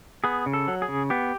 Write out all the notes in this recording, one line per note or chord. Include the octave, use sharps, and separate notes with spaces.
B3 G#4
C#3
A4
F#3
G#4
C#3
B3 G4